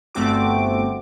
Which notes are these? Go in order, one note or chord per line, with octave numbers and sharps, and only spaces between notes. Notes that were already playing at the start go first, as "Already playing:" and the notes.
G1 A3 C4 F#4 D6